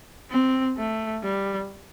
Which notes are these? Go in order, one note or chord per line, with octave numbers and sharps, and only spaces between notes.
C4
A3
G3